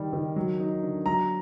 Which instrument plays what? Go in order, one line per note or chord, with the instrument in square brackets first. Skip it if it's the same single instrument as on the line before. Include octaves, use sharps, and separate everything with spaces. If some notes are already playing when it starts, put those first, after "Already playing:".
Already playing: [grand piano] D#3 G3
D#3
F#3
D#4
D3
F#3 A#5